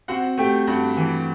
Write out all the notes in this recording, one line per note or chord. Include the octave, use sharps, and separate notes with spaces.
C4 F#4 F#5
A3 G4 G5
G2 F#4 F#5
E3